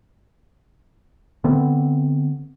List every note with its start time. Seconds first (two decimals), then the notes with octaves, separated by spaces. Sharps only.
1.44 D3 B3 C4